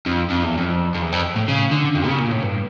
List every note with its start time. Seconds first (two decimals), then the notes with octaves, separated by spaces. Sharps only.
0.06 F2
0.30 F2
0.44 E2
0.58 F2
0.95 F2
1.02 E2
1.12 F2
1.36 A2
1.48 C#3
1.71 D3
1.95 F2
2.07 C#3
2.19 A#2
2.32 A2
2.43 G2